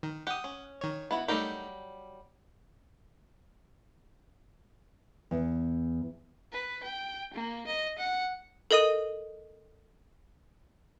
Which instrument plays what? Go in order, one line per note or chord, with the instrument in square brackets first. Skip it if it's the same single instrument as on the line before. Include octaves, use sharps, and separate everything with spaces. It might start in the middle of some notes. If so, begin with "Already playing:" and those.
[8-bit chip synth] D#3
[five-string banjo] G4 [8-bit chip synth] F#5 D#6
[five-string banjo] C#4
[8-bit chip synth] D#3 C#5
[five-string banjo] B3 E4 F#4
[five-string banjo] F#3 G3 G4 [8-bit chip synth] A3 D#4 A#4
[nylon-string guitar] E2
[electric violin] B4
G5
A#3
D#5
F#5
[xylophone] A4 A#4 D#5 D#6 D#7